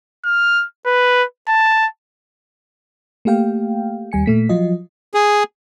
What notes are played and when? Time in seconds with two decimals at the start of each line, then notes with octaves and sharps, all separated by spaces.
0.24 F6
0.86 B4
1.48 A5
3.25 A3 A#3 G4 F5 G5
4.12 D#2 G3 G#5 C#7
4.26 A#2 A3 B6
4.49 F3 F#3 F4 D#5
5.14 G#4